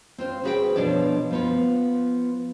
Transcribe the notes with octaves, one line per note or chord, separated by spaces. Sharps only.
C4 F4 C5
F#4 G#4 B4 C5 E5 G5
B2 F3 D4 C#5 D5
F3 B3 F4